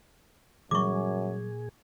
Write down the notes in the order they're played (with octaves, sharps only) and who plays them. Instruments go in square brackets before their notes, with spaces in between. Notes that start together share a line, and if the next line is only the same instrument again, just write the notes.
[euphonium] F#2 [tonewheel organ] A#2 G#4 [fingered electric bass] E3 F#3 G3 [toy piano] C#6 D6